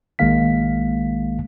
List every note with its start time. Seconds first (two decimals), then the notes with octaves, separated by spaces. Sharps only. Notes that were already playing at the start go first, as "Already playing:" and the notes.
0.19 A#1 D#3 G#3 A#3 F5 B6